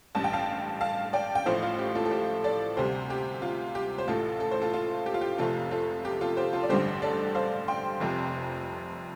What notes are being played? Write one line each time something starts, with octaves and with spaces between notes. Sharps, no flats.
A1 G2 G3 A5
G5
F5 A5
F5 A5
D5 G5
G5
A1 A2 F3 A3 C5 F5
F4
G4
F4 A4
A4
G4 C5
A4 D5
D2 C3 G3 G4 C5
G4
F4
G4
C5
A1 A2 A3 F4 A4
A4
C5
F4 A4
F4
G4
F4
G4
F1 F2 C3 A3 F4 A4
F4 A4
G4
F4 A4
G4 C5
F4 A4
D5
A1 G2 D3 G3 G4 C5
A4 D5
C5 F5
G5 C6
F1 F2 C3